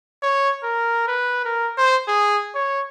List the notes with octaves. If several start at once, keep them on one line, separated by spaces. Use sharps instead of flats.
C#5
A#4
B4
A#4
C5
G#4
C#5